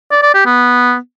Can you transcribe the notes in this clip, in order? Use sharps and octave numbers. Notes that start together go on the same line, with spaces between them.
D5
D5
G4
B3